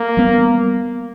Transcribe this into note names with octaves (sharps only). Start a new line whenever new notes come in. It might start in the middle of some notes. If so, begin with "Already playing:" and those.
Already playing: A#3
G3 B3